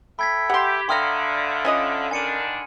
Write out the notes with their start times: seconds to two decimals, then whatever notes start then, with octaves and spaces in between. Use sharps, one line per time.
0.19 A4 E5 G5 B5 G#6 B6
0.50 G4 F#5 C6
0.89 D3 E5 F5 G5 A#5 C6 D#6 F6
1.65 C#4 F4 D#5
2.11 D3 D#3 D4 A#4 G#5 C#7 D#7